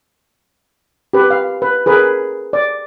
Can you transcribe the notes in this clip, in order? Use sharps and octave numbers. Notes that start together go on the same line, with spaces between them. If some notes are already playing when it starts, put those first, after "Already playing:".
G4 B4
F5
B4
G#4 A#4 B4
D5